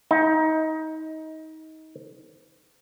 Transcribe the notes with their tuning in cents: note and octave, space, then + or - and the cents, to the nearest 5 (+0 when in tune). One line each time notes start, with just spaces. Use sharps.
D#4 +25